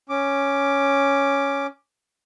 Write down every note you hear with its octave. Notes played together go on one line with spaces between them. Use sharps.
C#4 D6